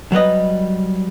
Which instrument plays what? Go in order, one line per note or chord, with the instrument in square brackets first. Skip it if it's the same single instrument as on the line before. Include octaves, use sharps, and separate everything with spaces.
[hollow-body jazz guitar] F#3 G3 B4 D#5